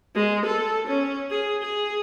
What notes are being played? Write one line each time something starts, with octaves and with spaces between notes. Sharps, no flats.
G#3
A4
C#4
G#4
G#4